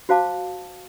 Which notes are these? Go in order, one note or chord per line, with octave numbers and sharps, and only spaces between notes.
F#4 C5 F5 A5 D6